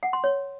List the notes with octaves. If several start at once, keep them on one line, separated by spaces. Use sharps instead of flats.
F#5
C6
C#5